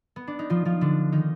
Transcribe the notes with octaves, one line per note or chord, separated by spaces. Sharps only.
B3
D4
D#4
F3 F4
F3 F4
D3 D4
D#3 D#4